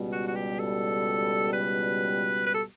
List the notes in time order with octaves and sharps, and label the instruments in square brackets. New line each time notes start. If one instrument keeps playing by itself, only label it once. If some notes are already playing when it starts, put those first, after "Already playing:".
Already playing: [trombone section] C#2 B2 G3
[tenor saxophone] F#4
F#4
G4
A4
B4
B4
A4